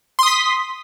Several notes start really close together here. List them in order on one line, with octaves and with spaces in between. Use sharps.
C6 D#6 B6